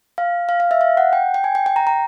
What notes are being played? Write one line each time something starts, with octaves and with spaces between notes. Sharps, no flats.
F5
F5
F5
E5
F5
F#5
G5
G5
G#5
G5
G5
A#5
A#5